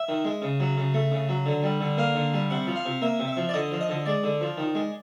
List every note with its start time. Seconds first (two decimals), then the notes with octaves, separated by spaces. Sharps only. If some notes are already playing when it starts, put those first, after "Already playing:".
Already playing: E5
0.09 D#3
0.25 G#3
0.42 C#3
0.60 F#3
0.77 C#3
0.94 A3
1.12 C#3
1.29 F#3
1.46 D3
1.63 G3
1.80 D3
1.98 A#3 F5
2.15 D3
2.34 G3
2.50 C3 F#5
2.67 F3
2.76 F5
2.86 C3
3.02 A#3 E5
3.20 C3
3.28 E5
3.37 F3
3.49 D5
3.54 D3 D#5
3.71 F3
3.81 D#5
3.89 D3
4.06 G#3 D5
4.24 D3
4.41 F3
4.58 D#3
4.75 G#3